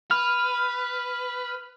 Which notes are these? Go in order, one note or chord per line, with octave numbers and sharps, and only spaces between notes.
B4 F6